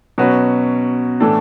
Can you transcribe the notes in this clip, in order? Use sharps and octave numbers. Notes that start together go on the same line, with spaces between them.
B2 F#3 C#4 F#4 B4
A2 E3 A3 D4 A4